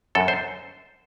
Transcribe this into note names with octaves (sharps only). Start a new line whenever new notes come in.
F#2 A4
C5